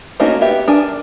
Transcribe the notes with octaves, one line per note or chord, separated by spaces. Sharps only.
A3 A#3 C#4 D#4 F#4
B3 G4 E5
D4 A#4 G#5